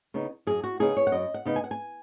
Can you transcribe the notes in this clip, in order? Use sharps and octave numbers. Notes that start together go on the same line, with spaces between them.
C#3 B3 D#4
F#2 G#4
F#4
C#3 B3 D#4 G#4
C#5
F#5
F#2 D#5
F#5
C#3 B3 D#4
G#5
F#5
G#5